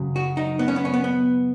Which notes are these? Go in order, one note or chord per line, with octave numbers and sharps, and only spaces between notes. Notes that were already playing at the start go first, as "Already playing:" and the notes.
Already playing: F#2 C#3 F#3
F#4
D#4
B3
C#4
B3
C#4
B3
B3